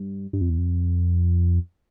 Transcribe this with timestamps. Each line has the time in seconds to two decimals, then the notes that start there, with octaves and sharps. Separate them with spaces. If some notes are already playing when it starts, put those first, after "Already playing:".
Already playing: G2
0.33 G2
0.41 F2
0.50 E2
0.58 F2